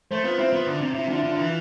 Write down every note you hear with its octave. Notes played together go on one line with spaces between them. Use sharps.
A3 C5
B3 F4
C4 E4
B3 F4
D3
C3
C3 E4
D3 F4
E4
D3 F4
E3 E4
F4